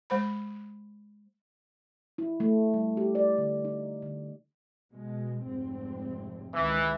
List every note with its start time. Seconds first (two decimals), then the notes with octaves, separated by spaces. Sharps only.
0.10 G#3 C5 B5
2.18 E4
2.40 A3
2.74 G3
2.97 G4
3.15 D5
3.38 D3
3.65 D#4
4.02 D3
4.92 B2 G#3
5.44 F1 G#2 C4
6.54 C#2 D#3 E3